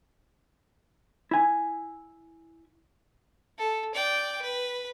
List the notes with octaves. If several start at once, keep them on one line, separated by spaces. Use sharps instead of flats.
E4 G#5
A4
D5 G5
B4